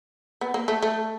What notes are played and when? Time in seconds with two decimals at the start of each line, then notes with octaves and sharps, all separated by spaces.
0.41 B3
0.54 A#3
0.68 A3
0.82 A3